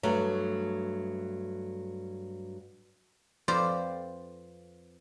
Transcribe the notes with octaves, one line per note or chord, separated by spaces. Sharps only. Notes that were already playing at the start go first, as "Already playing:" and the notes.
G2 F#3 A3
F2 C4 F4 B4 C5 D5